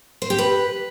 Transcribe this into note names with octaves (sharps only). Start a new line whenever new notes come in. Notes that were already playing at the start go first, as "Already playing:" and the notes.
C5
G4
B4